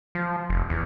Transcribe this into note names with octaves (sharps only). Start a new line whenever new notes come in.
F3
F1
E2